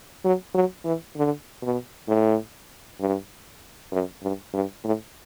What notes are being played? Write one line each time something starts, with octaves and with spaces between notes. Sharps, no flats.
F#3
F#3
E3
D3
B2
A2
G2
F#2
G2
G2
A2